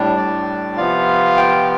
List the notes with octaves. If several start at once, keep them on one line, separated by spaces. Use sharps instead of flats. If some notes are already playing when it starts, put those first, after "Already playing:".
Already playing: A2 G3 D4
D5
C3 F3 B3 F4 F5
G5